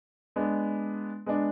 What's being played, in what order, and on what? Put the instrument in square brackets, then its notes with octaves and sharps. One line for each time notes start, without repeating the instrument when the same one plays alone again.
[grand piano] G#3 B3 D4
G#3 B3 D4